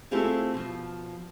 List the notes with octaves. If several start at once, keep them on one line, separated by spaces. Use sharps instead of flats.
A3 C4 E4 F4 G4 G#4
B2 F3